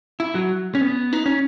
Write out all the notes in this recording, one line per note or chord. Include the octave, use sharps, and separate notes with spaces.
E4
F#3
C#4
B3
D#4
C#4